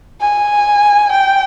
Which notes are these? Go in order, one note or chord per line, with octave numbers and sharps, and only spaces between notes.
G#5
G5